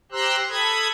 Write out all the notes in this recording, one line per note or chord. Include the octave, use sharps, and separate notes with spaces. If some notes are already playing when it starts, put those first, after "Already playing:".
G4 C5 A#5 C6 E6 F#6
A4 B5 D#6 G#6